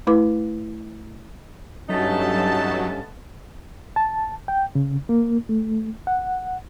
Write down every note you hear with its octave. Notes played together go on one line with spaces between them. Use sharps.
A3 E4 B4 D6
G2 F#3 A3 B3 C#4 D#4 A4 A5
A5
G5
C#3
A#3
A3
F#5